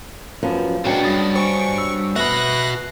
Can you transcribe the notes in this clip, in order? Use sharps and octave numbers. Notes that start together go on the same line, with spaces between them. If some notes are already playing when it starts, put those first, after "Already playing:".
F#2 F3 B3
C#3 F#3 G#3 D4 F#4 B4 G5 C#7
G2 D#6 A6
C5 G#5 C#6 D7
E6
B3 F#4 B4 E5 F#6 A#6